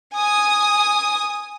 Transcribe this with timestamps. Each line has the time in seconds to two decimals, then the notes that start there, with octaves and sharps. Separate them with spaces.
0.14 G#5 D#6